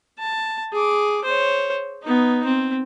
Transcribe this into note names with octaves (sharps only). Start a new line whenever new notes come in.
A5
G#4 D6
C5 C#5
B3 D#4
C4